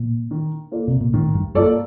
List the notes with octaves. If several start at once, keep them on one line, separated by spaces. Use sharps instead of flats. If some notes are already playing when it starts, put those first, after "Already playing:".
Already playing: A#2
D#3
A#3 F4 A4 D5
C3
A#2
A2 D#3
G2
G2 A#3 F4 A4 D5